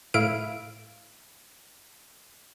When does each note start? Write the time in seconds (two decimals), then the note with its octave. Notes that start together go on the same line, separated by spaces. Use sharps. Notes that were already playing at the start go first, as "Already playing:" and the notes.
0.14 A2 E4 F5 D7